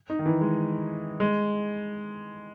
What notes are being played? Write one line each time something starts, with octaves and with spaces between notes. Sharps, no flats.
D#4
D#3
E3
G#3
G#3